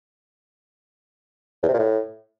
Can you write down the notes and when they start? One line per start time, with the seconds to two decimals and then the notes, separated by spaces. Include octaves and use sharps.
1.63 E2
1.68 C3
1.74 A#2
1.79 A2